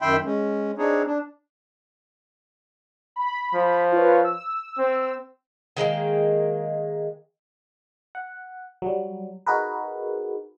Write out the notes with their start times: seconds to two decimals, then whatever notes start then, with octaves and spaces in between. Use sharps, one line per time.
0.02 F#2 D#3 E5 G5 B5 C6
0.25 G#3 C#4
0.78 C4 D4 D#4 G#4 C#5
1.06 D4
3.16 B5
3.54 F3
3.92 F4 B4 C#5
4.24 E6
4.78 C4
5.77 D#3 G#3 A#3 G5
8.15 F#5
8.82 F#3 G3
9.47 D#4 F#4 G#4 A#4 B4